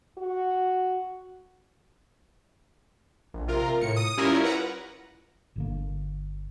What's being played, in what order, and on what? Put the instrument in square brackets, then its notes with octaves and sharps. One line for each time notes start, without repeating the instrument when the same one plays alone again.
[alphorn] F#4
[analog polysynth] A#1
C3 F4 A#4
A2 C#7
D#6
G3 C#4 E4 F4 A#4
B4 F#5 A#5
[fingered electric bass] G1 D3 A#3